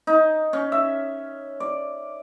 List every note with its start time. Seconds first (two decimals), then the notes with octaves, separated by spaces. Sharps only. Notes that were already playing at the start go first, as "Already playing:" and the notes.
0.07 D#4
0.53 C#4
0.72 E5
1.60 D5